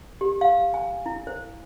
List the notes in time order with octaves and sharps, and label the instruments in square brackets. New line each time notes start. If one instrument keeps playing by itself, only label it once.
[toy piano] G4
F5
G#5
E4
C5